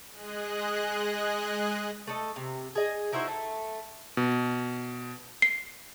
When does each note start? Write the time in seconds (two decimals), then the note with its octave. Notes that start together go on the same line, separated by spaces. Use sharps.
0.11 G#3 G#4 D#5 F#6
2.07 A3 A4 D#5
2.36 C3
2.75 G#4 D#5 G#5
3.12 D#4 E4 F#4 C5
3.27 A3
4.17 B2
5.42 C7